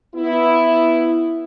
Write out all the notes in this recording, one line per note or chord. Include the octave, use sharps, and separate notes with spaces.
B3 E4